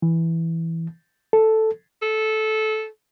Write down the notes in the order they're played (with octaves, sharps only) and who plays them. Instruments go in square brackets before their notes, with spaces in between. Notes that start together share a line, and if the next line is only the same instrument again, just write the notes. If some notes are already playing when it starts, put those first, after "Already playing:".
[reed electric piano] E3
A4
[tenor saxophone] A4